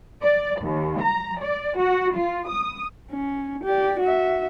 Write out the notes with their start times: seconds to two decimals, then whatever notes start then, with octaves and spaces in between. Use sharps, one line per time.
0.23 D5
0.62 D#2
1.02 A#5
1.41 D5
1.79 F#4
2.15 F4
2.48 D#6
3.11 C#4
3.64 G4 D5
4.00 F#4 E5